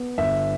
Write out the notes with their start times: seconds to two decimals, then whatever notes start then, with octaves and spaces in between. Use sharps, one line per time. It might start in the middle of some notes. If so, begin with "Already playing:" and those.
Already playing: B3
0.18 G1 E5